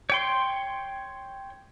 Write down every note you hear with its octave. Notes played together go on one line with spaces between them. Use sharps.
C#5 G5 C6